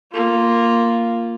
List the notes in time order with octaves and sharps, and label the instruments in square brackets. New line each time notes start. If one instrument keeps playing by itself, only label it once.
[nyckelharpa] A#3 F4